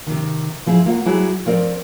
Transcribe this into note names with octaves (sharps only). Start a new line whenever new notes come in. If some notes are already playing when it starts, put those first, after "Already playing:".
C3 D#3
F3 E4 G#4
A#3 F4 D5 F#5
F#3 G3 E4 F#4 G#4
F3 C4 A#4 D5